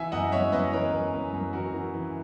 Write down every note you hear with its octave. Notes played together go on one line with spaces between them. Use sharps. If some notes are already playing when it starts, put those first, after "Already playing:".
Already playing: E3 E5 G#5
F#2 D#5 F#5
F#2 C#5 E5
F#2 B4 D#5
E3 A#4 C#5
F#2
F#2
F#2
E3 F#4 A#4
E3
E3